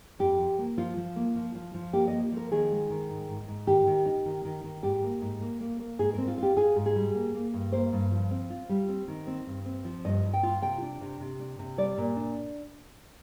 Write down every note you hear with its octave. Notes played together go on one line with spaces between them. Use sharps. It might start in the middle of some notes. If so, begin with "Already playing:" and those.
F2 G4
F3
A#3
F3 F4
F3
A#3
F3
F3
F3
A#3 G4
D#5
A#3
F3 A#4
D#3 G#4
G#3
D#3
G#2
G#2
G#2
D#3 G4
D#3
D#4
D#3
D#3
D#3
G#2 G4
A#3
G#2
A#3
A#3
A#3
G#2 G#4
C4 A#4
F4
F4
G4
F4 G#4
G#2
G#4
G3
A#3
A#3
G2
A#3 C5
G2
F3
C4
F4
G3
C4
D#3
C4
G2
C4
F3
G2 D#5
G2
G5
F4
C3 G5
D4
C3
C3
D4
C3
G3 D5
A#2
D4